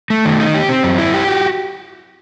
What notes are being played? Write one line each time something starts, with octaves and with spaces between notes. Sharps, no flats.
A3
D#3
D#4
G4
C4
F#2
E4
G4
F#4